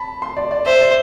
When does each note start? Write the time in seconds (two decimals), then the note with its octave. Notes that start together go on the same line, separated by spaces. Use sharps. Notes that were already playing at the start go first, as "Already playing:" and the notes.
Already playing: A5 B5
0.22 C6
0.37 D5
0.51 D5
0.66 C5 E5
0.81 D5